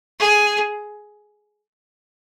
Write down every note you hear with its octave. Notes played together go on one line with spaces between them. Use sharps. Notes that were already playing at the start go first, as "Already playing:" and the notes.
G#4